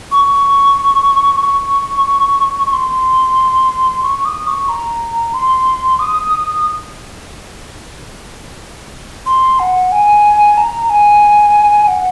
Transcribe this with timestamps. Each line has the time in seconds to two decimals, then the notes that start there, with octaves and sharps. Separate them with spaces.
0.12 C#6
1.42 C#6
2.66 C#6
2.73 C6
4.03 C#6
4.25 D#6
4.47 C#6
4.69 A#5
5.34 C6
5.99 D#6
9.26 C6
9.59 F#5
9.92 G#5
10.57 A#5
10.90 G#5
11.88 F#5